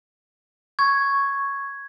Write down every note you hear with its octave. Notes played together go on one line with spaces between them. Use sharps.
C#6 G#6